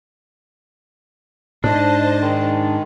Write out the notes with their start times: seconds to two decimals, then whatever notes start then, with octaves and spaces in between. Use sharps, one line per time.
1.64 G#2 D4 C5 D#5 A5
2.21 D#3 G#3